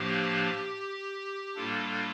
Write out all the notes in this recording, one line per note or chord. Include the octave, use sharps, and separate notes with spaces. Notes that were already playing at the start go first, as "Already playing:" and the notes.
Already playing: A2 F3 A#3 D4 G4
A2 G3 A#3 D4 F4 A4